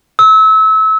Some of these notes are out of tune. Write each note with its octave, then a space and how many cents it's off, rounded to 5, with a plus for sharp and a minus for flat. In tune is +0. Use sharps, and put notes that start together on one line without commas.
E6 -30